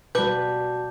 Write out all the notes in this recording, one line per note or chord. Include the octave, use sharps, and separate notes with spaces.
B2 G3 F#4 B4 A5 D6 G6